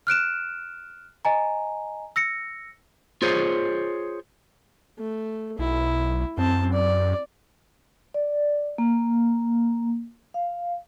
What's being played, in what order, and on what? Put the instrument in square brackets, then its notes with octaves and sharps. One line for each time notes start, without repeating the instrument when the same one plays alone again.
[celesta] F6 F#6 D7 E7
D#5 G#5 A#5
E6 A#6 C#7
[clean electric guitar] F4 G#4 C5 C#5
[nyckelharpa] A3
[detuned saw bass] B1 [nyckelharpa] E4
[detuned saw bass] F#2 [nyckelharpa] C4 A5
[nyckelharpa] D5
[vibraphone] D5
A#3
F5